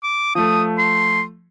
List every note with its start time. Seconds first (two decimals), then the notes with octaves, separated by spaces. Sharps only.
0.03 D6
0.35 F3 A3 D#6
0.78 C6